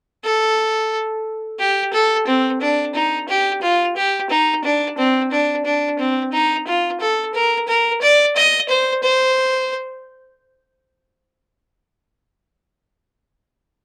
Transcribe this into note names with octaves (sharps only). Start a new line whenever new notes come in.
A4
G4
A4
C4
D4
D#4
G4
F4
G4
D#4
D4
C4
D4
D4
C4
D#4
F4
A4
A#4
A#4
D5
D#5
C5
C5